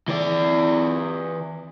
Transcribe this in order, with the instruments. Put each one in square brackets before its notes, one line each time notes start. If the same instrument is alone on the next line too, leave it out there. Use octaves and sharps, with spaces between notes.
[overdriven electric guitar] E3 D5